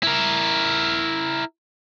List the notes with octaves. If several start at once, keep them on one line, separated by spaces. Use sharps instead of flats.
E4 A#4